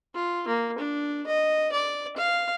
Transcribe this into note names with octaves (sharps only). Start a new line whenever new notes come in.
F4
A#3
D4
D#5
D5
F5